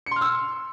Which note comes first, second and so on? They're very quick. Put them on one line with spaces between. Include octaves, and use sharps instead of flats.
C#7 C6 F6 E6